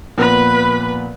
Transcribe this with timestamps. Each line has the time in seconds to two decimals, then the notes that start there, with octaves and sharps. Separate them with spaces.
0.18 A#2 F3 B3 B4 B5